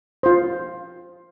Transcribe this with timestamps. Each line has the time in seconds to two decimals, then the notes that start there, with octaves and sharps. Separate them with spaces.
0.23 F4 C5